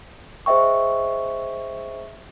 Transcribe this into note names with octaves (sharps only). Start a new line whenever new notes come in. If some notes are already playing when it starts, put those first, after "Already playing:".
G#4 C5 D#5 E5 G5 C#6